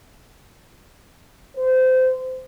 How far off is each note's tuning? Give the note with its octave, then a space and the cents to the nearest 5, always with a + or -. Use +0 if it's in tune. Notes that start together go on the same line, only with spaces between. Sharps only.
C5 -25